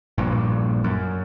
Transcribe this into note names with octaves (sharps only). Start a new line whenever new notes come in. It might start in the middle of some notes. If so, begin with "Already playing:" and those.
A#1 G2 A#2
F#2